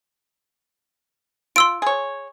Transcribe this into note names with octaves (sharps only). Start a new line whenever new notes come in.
F4 C6 E6 D7
G#4 C#5